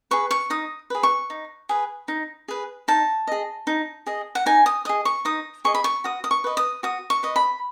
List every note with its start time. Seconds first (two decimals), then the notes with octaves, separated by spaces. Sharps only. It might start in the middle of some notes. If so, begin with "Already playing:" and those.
0.11 G#4 B4 C#6
0.31 C#6
0.50 D#4 D#6
0.90 G#4 B4
1.03 C#6
1.30 D#4
1.69 G#4 B4
2.08 D#4
2.48 G#4 B4
2.88 D#4 A5
3.27 G#4 D#5
3.67 D#4
4.06 G#4 D#5
4.35 F#5
4.46 D#4 G#5
4.66 D#6
4.85 G#4 D#5 D#6
5.05 C#6
5.25 D#4 D#6
5.65 G#4 D#5 C#6
5.74 B5
5.84 C#6
6.04 F#4 D#6
6.24 D#6
6.31 C#6
6.44 B4 D#5
6.57 D#6
6.83 F#4 D#6
7.10 C#6
7.23 B4 D#5
7.36 B5